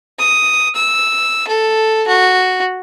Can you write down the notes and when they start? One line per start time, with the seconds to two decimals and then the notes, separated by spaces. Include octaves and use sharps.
0.19 D#6
0.75 E6
1.47 A4
2.07 F#4